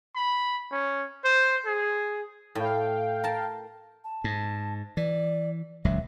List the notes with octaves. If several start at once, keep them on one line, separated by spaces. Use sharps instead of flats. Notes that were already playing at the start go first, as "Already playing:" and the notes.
B5
C#4
C5
G#4
A2 F5 G5
A#4 A5
A5
G#2
E3 D5
D#1 C#2 F#3 E5